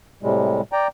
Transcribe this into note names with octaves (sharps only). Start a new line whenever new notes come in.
A2 C3 G3 G#3
D5 G5 A#5